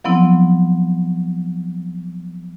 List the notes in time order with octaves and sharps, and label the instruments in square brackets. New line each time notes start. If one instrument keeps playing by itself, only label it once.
[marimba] F3 F#3 B3 C4 E4